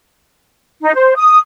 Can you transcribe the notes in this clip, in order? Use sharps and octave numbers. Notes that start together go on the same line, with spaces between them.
D#4
C5
D#6